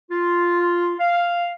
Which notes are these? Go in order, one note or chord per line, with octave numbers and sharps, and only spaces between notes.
F4
F5